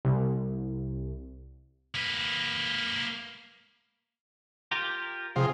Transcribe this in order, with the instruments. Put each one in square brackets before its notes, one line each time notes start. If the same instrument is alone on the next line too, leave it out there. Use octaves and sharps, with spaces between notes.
[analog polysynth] C2
[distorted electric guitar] A#3 B4
[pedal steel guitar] F4 G4 A#4
[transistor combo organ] C3 F3 [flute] G#4